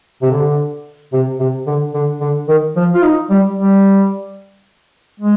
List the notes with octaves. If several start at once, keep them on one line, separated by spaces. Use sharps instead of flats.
C3
D3
C3
C3
D3
D3
D3
D#3
F3
F4
D#4
G3
G3
G#3